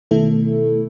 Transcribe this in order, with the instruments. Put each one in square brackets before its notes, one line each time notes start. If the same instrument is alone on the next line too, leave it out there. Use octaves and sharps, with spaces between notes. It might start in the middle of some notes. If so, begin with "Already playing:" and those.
[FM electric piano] B2 D#3 A3 E4 A4